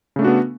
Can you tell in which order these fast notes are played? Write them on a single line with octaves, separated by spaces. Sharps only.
C#3 A3 D4 F#4 B3